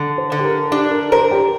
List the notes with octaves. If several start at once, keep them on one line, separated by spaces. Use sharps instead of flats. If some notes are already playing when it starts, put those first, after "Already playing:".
Already playing: D3
C5
D3
G4
A#4
D4 G4
A#4
A#4 C5
G4